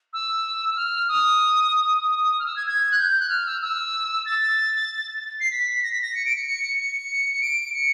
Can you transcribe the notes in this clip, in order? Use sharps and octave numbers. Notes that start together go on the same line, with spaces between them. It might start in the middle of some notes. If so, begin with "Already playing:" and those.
E6
F6
D#6
D#6
F6
E6
G#6
G#6
F#6
G6
F#6
F6
E6
E6
A6
C7
B6
A#6
B6
A#6
C#7
D7
C#7
C#7
C#7
C#7
D7
C#7